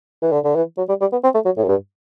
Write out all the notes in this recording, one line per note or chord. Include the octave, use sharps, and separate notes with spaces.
E3
D3
D3
E3
F#3
G3
G3
B3
C4
A3
F#3
A2
F#2
G2